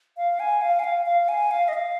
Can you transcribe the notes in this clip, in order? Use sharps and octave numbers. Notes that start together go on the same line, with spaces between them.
F5
G#5
F5
G#5
F5
F5
G#5
F5
D#5
F5